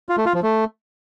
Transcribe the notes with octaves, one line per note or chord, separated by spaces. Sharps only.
F4
A3
F4
F3
A3